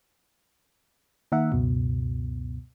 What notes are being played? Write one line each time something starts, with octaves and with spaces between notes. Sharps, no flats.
D#3 A#3 A#4 E5 F#5
C#2 F#2 B2